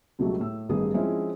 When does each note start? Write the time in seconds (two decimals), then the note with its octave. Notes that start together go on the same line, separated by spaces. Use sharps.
0.19 C#2 B2 F#3 G3 A3
0.40 A2 E6
0.69 A1 G2 D#3 B3 G#4 D#6
0.94 F3 G#3 C4 C#4 E4